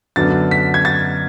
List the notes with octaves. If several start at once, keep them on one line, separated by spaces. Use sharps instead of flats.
F#2 D3 F#3 B3 D4 A6
B6
G#6
A6